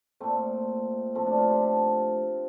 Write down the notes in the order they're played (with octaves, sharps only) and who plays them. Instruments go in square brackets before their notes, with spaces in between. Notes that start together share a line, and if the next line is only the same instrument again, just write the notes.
[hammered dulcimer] A#2 A3 C4
A2 F3 A3 C4
D4
F4
G4
A4